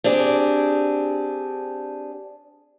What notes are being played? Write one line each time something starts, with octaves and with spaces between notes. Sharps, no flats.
C4 D4 G4 G#4